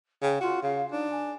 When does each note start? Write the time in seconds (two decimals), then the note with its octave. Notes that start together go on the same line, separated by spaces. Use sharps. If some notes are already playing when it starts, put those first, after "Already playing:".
0.22 C#3 G5
0.41 F4 F#4
0.63 C#3 F5
0.92 D4 D#4
1.10 G#5